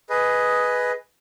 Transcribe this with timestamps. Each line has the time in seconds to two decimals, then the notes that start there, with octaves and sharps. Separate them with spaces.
0.10 G#4 B4 D#5